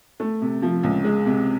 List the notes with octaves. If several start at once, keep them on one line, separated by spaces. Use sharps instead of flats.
A3
C3
F3
C#2
G#3
C3